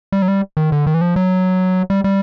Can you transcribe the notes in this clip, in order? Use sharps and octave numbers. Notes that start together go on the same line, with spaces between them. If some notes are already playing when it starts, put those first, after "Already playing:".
G3
F#3
G3
D#3
D3
D#3
E3
F3
F#3
G3
G3